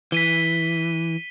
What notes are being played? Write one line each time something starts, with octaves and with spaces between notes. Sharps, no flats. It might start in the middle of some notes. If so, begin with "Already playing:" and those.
E3 B6 D#7 G7